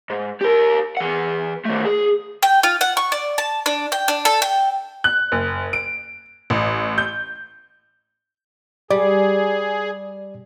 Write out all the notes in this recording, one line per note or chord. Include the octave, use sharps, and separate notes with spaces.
G#2
G4 A#4
E3 F#5
D#3 A3
G#4
G5
F4
F#5
C#6
D5
A5
D4
G5
D4
A4
G5
F#6
F#1
D7
A1
G6
G3 G#4 D5